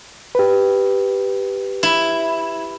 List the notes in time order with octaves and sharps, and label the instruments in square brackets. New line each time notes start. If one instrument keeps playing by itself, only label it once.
[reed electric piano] G4 B4
[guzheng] E4